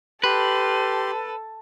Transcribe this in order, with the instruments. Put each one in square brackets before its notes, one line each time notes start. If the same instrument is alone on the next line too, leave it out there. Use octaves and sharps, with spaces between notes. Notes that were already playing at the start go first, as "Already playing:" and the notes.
[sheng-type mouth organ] G4 C6 [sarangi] A4 [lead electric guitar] B4